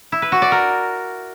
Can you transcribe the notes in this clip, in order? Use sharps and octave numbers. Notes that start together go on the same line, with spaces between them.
E4
B4
F#4
D5
A#4